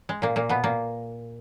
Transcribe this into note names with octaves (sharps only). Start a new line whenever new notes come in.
G#3
A#2 A#3
A#2 A#3
B2 B3
A#2 A#3